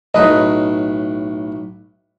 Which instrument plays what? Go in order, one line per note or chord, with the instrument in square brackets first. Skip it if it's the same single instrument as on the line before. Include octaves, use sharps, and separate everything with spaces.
[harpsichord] B1 A2 B4 [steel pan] D#5